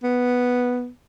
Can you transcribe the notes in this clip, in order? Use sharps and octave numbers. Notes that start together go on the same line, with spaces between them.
B3